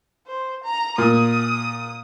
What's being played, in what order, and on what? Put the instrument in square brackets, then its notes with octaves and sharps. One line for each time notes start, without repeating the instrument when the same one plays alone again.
[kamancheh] C5
A#5
[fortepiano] A#2 [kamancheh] D#6